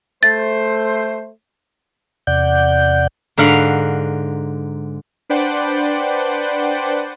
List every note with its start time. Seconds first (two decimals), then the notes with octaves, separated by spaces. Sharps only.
0.23 A3 C5 A6
2.27 E2 C3 D5 F#5 G6
3.37 G#2 D3 A#4 F5 F#5 B5
5.29 D4 B4 C5 D5 F#5 G5